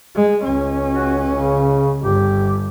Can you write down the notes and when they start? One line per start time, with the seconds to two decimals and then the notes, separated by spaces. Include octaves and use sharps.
0.15 G#3
0.44 C#2 C#4
0.91 F#4
1.30 C#3
2.02 G1 G4